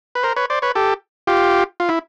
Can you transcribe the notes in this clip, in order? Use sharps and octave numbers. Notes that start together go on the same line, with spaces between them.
B4
A#4 C5
B4 C#5
C5 D5
B4 C#5
G4 A4
F4 G4
F4
E4